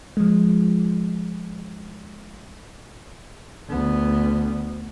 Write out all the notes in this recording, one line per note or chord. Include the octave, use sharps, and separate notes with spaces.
F3 G#3
D2 B3